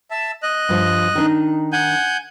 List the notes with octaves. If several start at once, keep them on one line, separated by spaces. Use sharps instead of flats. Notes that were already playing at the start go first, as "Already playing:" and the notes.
E5 A5
D#5 F#6
G2 F3
D#3 D4 D#4
F#5 G#5 G6